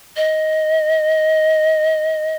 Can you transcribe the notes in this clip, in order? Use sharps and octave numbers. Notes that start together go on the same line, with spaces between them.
D#5